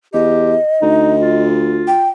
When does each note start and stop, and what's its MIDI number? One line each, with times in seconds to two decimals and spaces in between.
0.13 0.55 40
0.13 0.57 67
0.13 1.44 75
0.82 1.91 38
0.82 1.15 63
1.21 2.12 65
1.88 2.09 79